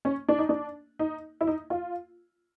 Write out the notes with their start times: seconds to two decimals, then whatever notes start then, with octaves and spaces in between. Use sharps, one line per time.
0.05 C#4
0.28 D4
0.39 D#4
0.49 D4
0.99 D#4
1.41 E4
1.47 D#4
1.70 F4